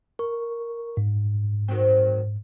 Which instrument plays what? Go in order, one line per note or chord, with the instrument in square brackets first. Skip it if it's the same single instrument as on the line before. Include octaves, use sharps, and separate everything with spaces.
[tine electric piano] A#4 C#6
G#2
[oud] D#3 F#3 C4